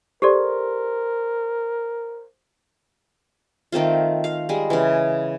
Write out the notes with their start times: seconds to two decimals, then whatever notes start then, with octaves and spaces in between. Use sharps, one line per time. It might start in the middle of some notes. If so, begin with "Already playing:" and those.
0.22 G4 A4 A#4 C5 D5 C6
3.72 D#3 A3 C4 F4
4.24 F5
4.49 G3 G#3
4.70 C#3 E3